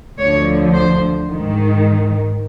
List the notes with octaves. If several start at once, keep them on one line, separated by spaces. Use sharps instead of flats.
D2 D3 F3 C#5
C5
G#2 D#3